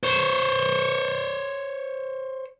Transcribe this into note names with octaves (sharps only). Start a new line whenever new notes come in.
C5 C#5